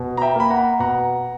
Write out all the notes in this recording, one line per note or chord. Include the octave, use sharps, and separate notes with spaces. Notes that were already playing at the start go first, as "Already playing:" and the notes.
Already playing: B2
A#5
E5 G5
A#3 B5
F#5 A#5
B2 F#5 A#5